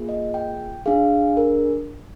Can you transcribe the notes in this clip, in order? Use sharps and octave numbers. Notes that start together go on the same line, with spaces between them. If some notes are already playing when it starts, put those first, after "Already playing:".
Already playing: A#3 F4 G#4
D#5
G5
D4 G#4 F5
A#4